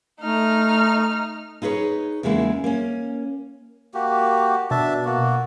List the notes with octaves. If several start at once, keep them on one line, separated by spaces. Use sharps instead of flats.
A3 D#4 F6
D#4 E4 G#4 B4 C#5
E2 C#3 G#3 A#3 E4
A#3 C#4
A#3 F#4 G4
B2 D4 E5 A5
A#3 F#4